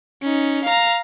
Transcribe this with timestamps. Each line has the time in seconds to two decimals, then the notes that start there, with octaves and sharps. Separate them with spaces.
0.22 C#4 D#4
0.64 F5 A#5